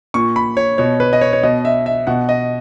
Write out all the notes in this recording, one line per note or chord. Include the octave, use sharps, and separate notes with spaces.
A#2 C#6
B5
C#5
B2 C#5
B4
D#5
C#5
C#5
B2 D#5
E5
E5
B2 F#5
D#5